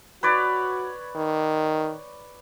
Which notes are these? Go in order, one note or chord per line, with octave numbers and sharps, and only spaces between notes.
F#4 B4 C#5 D5
D#3